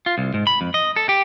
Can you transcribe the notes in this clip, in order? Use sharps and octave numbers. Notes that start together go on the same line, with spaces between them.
F4
C2
G#2
B5
F2
D#5
A4
G4